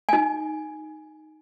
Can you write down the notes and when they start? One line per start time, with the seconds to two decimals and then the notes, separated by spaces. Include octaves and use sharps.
0.09 D#4 G#5